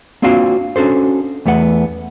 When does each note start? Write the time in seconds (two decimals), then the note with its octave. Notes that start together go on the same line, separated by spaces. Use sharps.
0.22 A#3 C4 D4 F4 F#4 F5
0.76 C#4 D4 F#4 A4 C5
1.46 E2 A3 B3 F#5